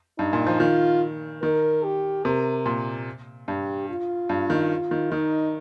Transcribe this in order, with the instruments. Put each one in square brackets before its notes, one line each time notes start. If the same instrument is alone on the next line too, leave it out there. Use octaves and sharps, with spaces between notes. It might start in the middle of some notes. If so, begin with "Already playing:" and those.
[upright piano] G2 [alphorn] D#4
[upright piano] A#2
F3
[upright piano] D#3 [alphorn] F4
[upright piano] D#3 [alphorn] A#4
[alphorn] G4
[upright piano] C3 [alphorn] A#4
[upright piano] A#2
[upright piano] G2 [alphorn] G4
[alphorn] F4
[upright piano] G2
D#3
D#3
[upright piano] D#3 [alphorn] D#4